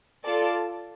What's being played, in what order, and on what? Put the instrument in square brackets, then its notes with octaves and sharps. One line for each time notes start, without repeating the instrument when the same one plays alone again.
[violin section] F4 A4 D5 A5